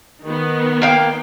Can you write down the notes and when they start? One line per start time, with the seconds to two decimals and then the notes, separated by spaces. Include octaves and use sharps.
0.23 D#3 B3
0.82 A#3 F5 G5